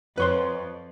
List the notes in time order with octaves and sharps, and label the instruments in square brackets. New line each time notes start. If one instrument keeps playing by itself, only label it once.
[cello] F2 [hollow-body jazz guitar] B4 C#5 C6